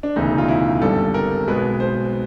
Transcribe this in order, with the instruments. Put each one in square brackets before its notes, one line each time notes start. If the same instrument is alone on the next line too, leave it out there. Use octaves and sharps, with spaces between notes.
[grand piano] D4
E1 D2 C#3 E3 D#4
F4
E4
G#1 G2 D3 G3 A4
A#4
B1 B2 G#3 B4
C5